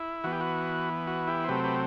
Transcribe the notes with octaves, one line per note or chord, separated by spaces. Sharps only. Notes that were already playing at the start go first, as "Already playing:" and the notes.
Already playing: E4
E3 B3 F#4
G4
F#4
F#4
E4 G4
C5
C3 F#3 A3 C4 G4 B4
G4 B4